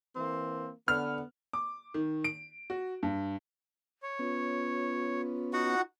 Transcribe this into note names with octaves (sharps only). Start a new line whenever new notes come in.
E3 A#3 C4
D3 B3 F6
D6
D#3
D7
F#4
G2
C#5
B3 C#4 F4
D#4 F#4 F#5